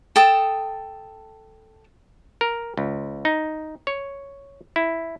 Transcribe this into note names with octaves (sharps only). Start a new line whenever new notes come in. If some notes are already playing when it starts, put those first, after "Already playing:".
A4 G5 A5 D#6
A#4
C#2
D#4
C#5
E4